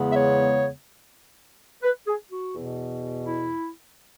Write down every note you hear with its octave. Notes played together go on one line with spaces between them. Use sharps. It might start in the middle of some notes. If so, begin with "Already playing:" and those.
Already playing: E2 C#3 G#3 B3
E5
C#5
B4
G#4
F#4
E2 B2 B3
E4